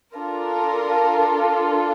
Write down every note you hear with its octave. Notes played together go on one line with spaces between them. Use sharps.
D4 F4 A4 A#4